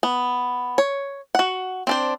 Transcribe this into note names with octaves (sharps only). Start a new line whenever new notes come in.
B3
C#5
F#4 F#5
C4 D4 C5